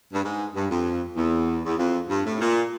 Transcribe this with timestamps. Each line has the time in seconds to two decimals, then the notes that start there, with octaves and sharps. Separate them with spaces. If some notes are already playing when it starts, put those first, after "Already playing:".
0.13 G2
0.23 G#2
0.55 G2
0.70 F2
1.16 E2
1.65 E2
1.78 F2
2.09 G2
2.25 A2
2.40 A#2